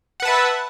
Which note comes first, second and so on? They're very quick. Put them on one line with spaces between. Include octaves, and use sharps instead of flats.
F#5 B4 A5 E5